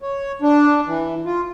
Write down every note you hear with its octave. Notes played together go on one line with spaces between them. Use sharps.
C#5
D4
E3
F4